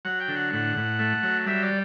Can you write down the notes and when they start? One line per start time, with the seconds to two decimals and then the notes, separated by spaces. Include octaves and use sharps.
0.05 F#3 F#5
0.20 G5
0.28 D3
0.36 F#5
0.53 A2 F#5
0.77 A2
0.99 A3
1.23 F#3
1.46 G3 E5
1.63 D5